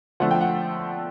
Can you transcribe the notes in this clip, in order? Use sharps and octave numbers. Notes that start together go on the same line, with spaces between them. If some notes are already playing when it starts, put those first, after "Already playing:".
D3 F3 A3 F#5
G5
F#5